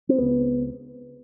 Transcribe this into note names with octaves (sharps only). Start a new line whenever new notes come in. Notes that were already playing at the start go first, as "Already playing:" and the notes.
C4
C#2 C#3 B3